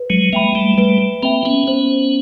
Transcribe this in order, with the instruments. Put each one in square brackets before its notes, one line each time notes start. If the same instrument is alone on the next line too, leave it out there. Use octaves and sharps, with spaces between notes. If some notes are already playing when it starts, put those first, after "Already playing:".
Already playing: [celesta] B4
[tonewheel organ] F#3 G#3
[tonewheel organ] G#3 A#3 [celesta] E5 G5 B5
[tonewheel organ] G3 A3
[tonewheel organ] G3 A3 [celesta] B4
[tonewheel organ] A#3 C4 [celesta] E5 G5 B5
[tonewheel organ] B3 C#4
[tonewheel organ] B3 C#4 [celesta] C5